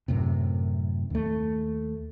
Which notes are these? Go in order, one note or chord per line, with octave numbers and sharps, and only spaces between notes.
F#2 A2 C3
D#2 A3